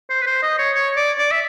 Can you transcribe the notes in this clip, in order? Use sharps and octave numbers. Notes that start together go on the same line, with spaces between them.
C5
B4
C5
D#5
C#5
C#5
D5
D5
E5